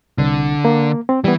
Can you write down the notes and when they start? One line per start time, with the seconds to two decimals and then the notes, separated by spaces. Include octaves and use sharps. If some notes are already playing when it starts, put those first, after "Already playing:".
0.18 C2 D3
0.65 A#3
1.09 C4
1.24 E3 G3 B3